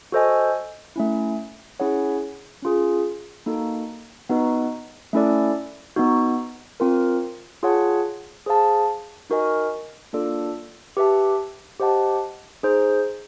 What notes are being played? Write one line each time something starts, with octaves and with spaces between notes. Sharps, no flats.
F#4 A4 C5 D#5 G#5
A3 C#4 E4
C#4 E4 G#4 C#5 F#5
C#4 F4 G#4
A#3 D#4 F#4 A4
B3 D#4 F#4 B4 D#5
A3 C#4 E4 A4 D5
B3 D#4 F#4
C4 F4 A#4
F4 G#4 C#5 F#5 A5
G#4 C5 F5 A5
D#4 F#4 A#4 D#5 G#5
A#3 D4 F4 A4 D5
G4 B4 E5 A5
G4 C5 D#5 F#5 A5
D#4 G#4 C5